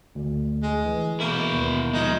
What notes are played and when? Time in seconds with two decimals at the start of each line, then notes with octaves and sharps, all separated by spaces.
0.15 D2
0.63 G#3
0.85 E3
1.20 B2 A#3 E4
1.52 D#2 B3
1.93 F3 G#3 D#4